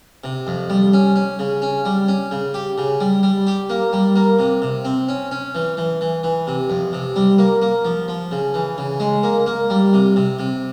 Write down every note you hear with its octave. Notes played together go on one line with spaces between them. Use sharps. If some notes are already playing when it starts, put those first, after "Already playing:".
C3
F2
G3
C#4
C#4
C#3
C#4
G3
C#4
C#3
G4
C#3
G3
G3
G4
A#3
G3
A#3
C3
C3
C4
C#4
C#4
E3
E3
E3
E3
C3
F2
C3
G3
A#3
A#3
F3
F3
C#3
E3
C#3
G#3
A#3
A#3
G3
C3
C3
C3